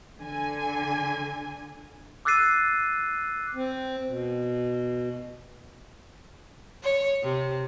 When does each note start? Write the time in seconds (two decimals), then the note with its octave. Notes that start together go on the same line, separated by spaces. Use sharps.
0.20 D3 G#5
2.25 D6 E6 F#6 A6 C7 D#7
3.53 C4
4.07 B2
6.83 C#5
7.23 C3